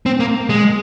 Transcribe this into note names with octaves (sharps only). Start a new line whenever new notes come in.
C4
A#3
G#3